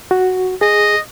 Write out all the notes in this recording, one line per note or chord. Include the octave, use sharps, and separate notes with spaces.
F#4
G#4 D#5